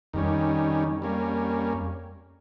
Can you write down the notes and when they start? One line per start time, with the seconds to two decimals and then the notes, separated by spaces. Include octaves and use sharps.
0.13 F2 D#3 G3 C#4
1.02 G3 A#3 C#4